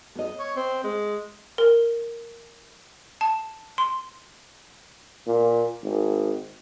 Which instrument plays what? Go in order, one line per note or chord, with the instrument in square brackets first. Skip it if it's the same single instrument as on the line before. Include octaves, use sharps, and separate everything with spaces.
[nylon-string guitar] B3 D#5
[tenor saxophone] C#5
C4
G#3
[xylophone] A#4
A5
C6
[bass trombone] A#2
G#1